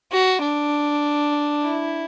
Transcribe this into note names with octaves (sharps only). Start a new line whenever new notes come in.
F#4
D4
E4